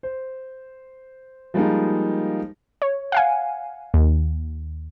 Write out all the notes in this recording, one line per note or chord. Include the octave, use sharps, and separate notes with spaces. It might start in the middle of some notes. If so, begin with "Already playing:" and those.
C5
F3 G3 G#3 A#3 D#4
C#5
F5 F#5 G#5
D#2